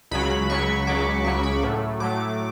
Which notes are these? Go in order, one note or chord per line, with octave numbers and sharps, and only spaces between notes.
C#2 C#3 F#3 B5
C#2 C#3 F#3 C#6
C#2 C#3 F#3 D6
C#2 C#3 F#3 C#6
B5
A2 F#3 A3
A2 F#3 A3 D6